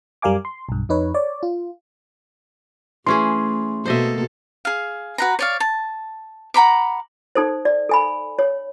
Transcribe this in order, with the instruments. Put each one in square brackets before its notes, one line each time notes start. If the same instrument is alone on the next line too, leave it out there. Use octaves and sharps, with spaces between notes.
[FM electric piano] F#2 G3 A#4 F5 G#5 D6
C6
B1 G2
F2 D#4 B4 C#5
C#5 D5
F4
[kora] E3 C#4 G#4 [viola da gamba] A3 [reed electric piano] C6
[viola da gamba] B2 A#3 A4 [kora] C5 D#5 E5
[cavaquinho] G#4 F5
F#4 B4 A#5
C#5 D5 F5
A5
F#5 A#5 B5 D6
[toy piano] D#4 A4 C5
D5
A4 G#5 B5
C#5